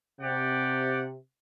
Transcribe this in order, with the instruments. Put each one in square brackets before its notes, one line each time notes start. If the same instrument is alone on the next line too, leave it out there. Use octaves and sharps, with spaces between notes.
[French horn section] C3 [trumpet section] G4 D5 F#5